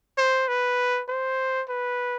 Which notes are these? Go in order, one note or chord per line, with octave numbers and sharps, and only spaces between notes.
C5
B4
C5
B4